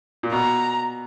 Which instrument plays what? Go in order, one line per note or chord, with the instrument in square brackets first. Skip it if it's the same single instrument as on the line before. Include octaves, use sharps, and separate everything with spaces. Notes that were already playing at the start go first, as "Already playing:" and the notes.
[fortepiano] A#2
[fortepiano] B2 [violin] A#5